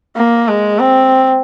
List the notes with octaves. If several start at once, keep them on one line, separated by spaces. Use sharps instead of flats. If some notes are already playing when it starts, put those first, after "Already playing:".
A#3
G#3
C4